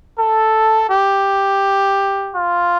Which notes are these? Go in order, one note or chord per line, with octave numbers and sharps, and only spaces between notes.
A4
G4
F4